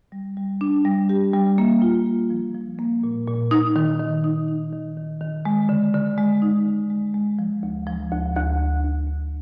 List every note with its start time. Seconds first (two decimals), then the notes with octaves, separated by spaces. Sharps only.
0.12 G3
0.37 G3
0.61 D4
0.85 G3
1.09 G4
1.34 G3
1.58 A#3
1.82 F4
2.06 A#3
2.30 F3
2.55 F3
2.79 A#3
3.03 A#2
3.27 A#2
3.51 D#4
3.76 D#3
4.00 D#3
4.24 D#4
4.48 D#4
4.73 D#3
4.97 D#3
5.21 D#3
5.45 G#3
5.69 D3
5.94 D3
6.18 G#3
6.42 D#4
6.66 D3
6.90 G#3
7.14 G#3
7.39 F3
7.63 D2
7.87 F3
8.11 D2
8.36 D2
8.60 D2
8.84 D2
9.08 D2